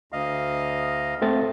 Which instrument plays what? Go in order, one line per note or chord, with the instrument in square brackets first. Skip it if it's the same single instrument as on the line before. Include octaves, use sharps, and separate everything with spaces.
[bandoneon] D2 D#5 F5
[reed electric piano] A3 C4 A6